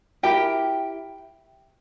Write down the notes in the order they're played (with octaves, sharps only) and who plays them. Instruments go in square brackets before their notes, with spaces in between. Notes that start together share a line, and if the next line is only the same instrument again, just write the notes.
[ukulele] E4 G4 A#4 G5